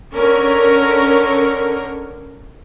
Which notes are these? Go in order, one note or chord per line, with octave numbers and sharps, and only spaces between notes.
D3 C#4 A#4